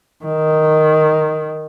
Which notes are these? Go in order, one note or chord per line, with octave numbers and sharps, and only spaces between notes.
D#3